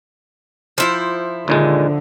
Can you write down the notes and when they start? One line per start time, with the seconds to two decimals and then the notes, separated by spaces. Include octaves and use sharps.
0.78 F3 E4 C5
1.48 D#2 A#2 D3 G#3